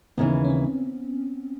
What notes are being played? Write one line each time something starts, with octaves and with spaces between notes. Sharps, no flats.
D#2 C#3 E3 B3
C#4
C4